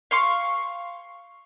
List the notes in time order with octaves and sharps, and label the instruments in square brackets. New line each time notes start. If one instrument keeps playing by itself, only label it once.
[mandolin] F5 C6 C#6